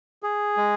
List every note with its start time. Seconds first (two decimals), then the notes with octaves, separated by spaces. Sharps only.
0.23 G#4
0.57 G#3